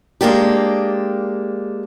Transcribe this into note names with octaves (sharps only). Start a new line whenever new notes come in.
G#3 A#3 D4 G4